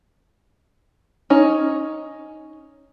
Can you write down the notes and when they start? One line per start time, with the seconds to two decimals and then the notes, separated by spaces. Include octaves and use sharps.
1.30 C#4 D#4 C#5